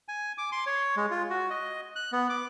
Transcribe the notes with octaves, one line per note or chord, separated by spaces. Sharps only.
G#5
D6
C6
C#5
G#3
F4
F#4
D#5
F#6
B3
D6